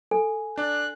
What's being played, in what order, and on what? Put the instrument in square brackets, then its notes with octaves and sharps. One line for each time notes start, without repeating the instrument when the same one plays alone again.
[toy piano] A4 [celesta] G#5
[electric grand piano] D4 D5 [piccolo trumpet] F#6